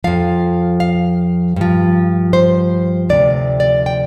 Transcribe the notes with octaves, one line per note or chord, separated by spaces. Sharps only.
F2 F3 F5
F5
G2 F3
C5
D2 C3 F3 D5
D5
G5